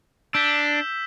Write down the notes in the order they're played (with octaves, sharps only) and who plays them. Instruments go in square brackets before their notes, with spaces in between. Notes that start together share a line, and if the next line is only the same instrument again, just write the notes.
[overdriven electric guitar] D4 [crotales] E6 G6 B6 E7 G7